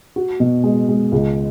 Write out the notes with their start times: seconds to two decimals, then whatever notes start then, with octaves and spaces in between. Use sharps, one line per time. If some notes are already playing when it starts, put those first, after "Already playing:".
0.16 F#4
0.40 B2
0.64 G#3
0.89 G#3
1.12 C#2